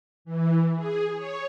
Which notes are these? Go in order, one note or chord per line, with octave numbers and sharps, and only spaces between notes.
E3
G#4
C#5